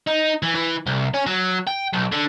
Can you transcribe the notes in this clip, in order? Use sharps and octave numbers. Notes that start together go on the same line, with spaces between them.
D#4
E3
E3
C2
C#4
F#3
G5
B1
D3